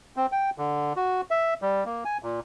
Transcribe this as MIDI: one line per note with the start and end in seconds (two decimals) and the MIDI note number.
0.16 0.26 60
0.32 0.50 79
0.58 0.93 50
0.96 1.21 66
1.31 1.54 76
1.62 1.84 55
1.85 2.04 58
2.05 2.18 80
2.23 2.40 46